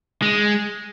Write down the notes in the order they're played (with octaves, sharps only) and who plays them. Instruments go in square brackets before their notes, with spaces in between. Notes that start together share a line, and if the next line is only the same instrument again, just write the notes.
[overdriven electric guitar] G#3